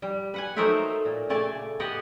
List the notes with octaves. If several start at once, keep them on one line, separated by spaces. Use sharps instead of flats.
G3
B4 F#5 G#5
F#3 A3 D#4 A#4 C5 E5
A#2
C#3 A3 D5 G#5 A5
B3 G4 D#5 F#5 G#5